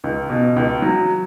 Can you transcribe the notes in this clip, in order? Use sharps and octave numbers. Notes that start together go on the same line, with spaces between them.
C#2
B2
C#2
F#3